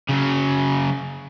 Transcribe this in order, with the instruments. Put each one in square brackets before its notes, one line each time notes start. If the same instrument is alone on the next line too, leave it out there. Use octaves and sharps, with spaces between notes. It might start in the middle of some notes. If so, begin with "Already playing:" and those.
[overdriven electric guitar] C#3 F#3